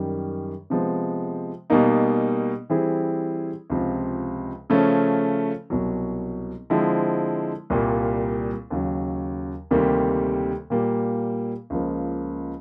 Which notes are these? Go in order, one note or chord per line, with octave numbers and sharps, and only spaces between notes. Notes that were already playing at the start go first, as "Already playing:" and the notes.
Already playing: F#2 D#3 G3
C3 F3 G#3 B3
B2 G3 A#3 D#4
E3 G3 C4 E4 G#4
C#2 C3 F3
C#3 F3 A3 C#4
C2 B2 F#3
D3 F3 G#3 C4 E4
C2 A#2 G3 A#3
D#2 C#3 F#3
D2 C3 D#3 G3 A#3
A#2 G3 A#3
C#2 C#3 F3 A#3